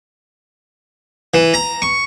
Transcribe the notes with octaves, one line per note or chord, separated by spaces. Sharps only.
E3
A#5
C#6